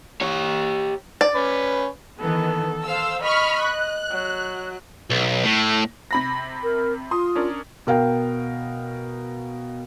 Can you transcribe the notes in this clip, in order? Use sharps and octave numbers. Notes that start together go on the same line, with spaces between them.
G4 C#5
D5
C#4 B4
D#3 E3 B3 A4
C5 F5 E6
D#5 B5 C#6 F6
F#6
F#3
B1
A2
C3 B5 A#6
A#4
F4 C6 D#6
C#4 D4 A#4
B2 A#4 F5 G5